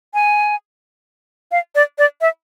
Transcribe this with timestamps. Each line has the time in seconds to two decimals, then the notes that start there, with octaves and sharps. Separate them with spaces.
0.14 G#5
1.52 F5
1.75 D5
1.98 D5
2.21 E5